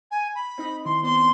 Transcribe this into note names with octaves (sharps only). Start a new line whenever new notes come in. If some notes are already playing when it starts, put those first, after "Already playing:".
G#5
B5
C4 D#4 D#5
D#3 E4 C6
B3 C4 D5 C6